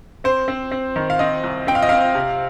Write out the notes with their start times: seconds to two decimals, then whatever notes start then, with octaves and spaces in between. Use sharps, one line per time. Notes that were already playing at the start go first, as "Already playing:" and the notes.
0.24 C4 C5
0.48 C4
0.71 C4
0.96 D#3
1.10 F5
1.19 C4 D#5
1.44 C2
1.67 C4 G5
1.75 F5
1.82 D#5
1.89 C4 F5
2.15 C3